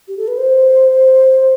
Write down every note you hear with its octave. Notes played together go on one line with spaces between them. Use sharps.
G4
A4
B4
C5